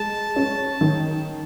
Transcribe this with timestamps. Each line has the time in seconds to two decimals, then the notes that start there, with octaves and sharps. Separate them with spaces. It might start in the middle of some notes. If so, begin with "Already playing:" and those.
Already playing: G#3 A5
0.36 C#4
0.81 D#3